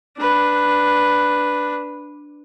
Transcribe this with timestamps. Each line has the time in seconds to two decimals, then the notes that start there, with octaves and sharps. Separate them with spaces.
0.18 D4 B4